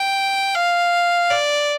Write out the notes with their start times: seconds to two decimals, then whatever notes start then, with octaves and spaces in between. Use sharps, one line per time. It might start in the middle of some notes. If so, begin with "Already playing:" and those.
Already playing: G5
0.55 F5
1.30 D5